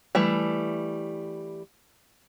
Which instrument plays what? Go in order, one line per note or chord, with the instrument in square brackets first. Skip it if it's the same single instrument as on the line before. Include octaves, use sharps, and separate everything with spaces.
[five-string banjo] E3 G3 A3